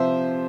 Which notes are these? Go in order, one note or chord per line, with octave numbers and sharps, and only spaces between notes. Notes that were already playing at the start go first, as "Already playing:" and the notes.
Already playing: C3 F3 C5 E5